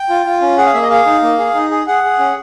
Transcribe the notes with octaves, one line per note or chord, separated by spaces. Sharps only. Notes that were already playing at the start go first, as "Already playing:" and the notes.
Already playing: G5
F4
F4
C#4
G#4 F#5
F5
A#3 E5
D#5
G#4 F5
D#4
A#3
G#4
D#4
G#4
G#4 F#5
G#4
C#4